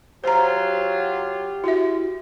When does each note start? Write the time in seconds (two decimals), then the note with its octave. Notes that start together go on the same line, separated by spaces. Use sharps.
0.24 F#3 F4 G4 C5 A#5
1.64 E4 F#4 E5